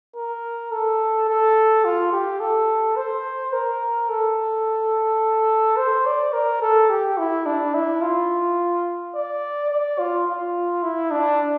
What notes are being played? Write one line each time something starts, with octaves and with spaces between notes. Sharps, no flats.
A#4
A4
A4
F4
G4
A4
C5
A#4
A4
C5
D5
A#4
A4
G4
E4
D4
E4
F4
D5
D5
F4
F4
E4
D4